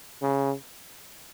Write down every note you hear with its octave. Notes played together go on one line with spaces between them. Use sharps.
C#3